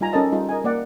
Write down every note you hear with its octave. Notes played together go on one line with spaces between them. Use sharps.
G3 D#4 F4 G#5 A#5
C#4 D#4 A4 A#4 D#5 A5
G3 D#4 F4 G#4
A#4 D#5 G#5
A#3 D5 F#5